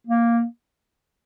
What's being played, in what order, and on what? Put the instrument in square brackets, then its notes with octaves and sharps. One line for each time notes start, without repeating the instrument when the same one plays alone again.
[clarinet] A#3